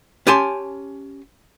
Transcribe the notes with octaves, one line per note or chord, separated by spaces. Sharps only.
C#4 G4 G#5 A5 C6